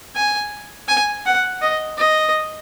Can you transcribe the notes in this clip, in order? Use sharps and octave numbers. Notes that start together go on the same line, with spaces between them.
G#5
G#5
F#5
D#5
D#5